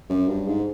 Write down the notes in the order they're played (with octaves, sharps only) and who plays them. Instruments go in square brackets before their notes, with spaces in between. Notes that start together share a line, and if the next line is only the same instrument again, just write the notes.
[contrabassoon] F#2
G2
G#2